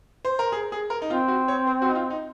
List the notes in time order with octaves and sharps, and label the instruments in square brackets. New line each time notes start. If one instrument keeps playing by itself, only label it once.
[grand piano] C5
A#4
G#4
G#4
A#4
D#4
[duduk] C4 [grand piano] F4
[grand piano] F#4
C#5
C5
F#4
D#4
F4
D#4